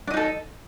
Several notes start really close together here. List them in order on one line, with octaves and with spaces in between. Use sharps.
D4 D#5 D#4 A4